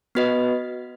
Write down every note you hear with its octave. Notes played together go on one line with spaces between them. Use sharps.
B3 F#4 B4 D#5